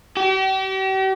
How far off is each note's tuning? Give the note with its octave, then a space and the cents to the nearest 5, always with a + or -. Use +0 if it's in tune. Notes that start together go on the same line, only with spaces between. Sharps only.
G4 -40